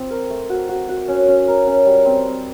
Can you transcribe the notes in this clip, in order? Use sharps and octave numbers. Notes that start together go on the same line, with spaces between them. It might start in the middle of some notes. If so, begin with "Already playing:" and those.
Already playing: C4 F4 C5
A#4
A3
F#4
F#4
F#4
C#4
C#4
A#4
C#4
G3
C4
C4